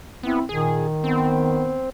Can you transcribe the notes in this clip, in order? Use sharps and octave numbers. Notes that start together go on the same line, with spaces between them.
B3 C4 E4
A#2 D#3 G#4
B3 C4